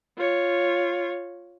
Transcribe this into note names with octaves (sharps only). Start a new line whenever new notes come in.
F4 C#5